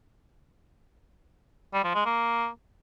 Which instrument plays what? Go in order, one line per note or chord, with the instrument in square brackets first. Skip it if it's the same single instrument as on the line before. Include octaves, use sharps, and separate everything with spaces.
[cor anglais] G3
F3
G#3
A#3